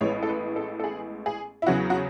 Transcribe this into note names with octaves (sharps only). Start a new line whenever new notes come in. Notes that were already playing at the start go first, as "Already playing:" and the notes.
A1 A2 G#3 B3 C#5
A4
B4
A4
A4
G#4
G#4
E4
E2 C#3 F#3 C#4 F#4
F#4